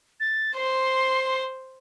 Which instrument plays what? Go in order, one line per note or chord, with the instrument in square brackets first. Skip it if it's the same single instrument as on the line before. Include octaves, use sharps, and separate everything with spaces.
[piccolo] A6
[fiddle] C5 [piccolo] C6